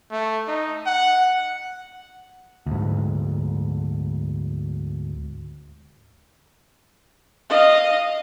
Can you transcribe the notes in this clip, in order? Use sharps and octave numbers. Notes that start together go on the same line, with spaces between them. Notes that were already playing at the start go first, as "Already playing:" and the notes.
A3
D#4
F#5
D2 G#2
D#5 F5